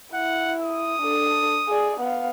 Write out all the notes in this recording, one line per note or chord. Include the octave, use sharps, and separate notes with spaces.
E4 F#5
D#6
D4 A4
G#4 D5
B3 F5